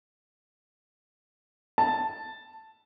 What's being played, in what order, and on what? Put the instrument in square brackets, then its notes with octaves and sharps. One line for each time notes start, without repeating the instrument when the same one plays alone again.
[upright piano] A5